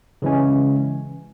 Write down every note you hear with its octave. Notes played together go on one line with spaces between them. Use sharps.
C#3 E3 G#3 C#4